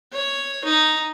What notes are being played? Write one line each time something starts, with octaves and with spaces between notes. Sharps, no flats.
C#5
D#4